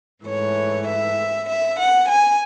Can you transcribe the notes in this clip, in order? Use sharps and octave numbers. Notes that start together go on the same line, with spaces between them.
G#2 E3 A3 C#5
E5
E5
F#5
G#5